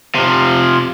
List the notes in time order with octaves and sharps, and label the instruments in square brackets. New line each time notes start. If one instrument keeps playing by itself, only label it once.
[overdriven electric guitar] C3 F3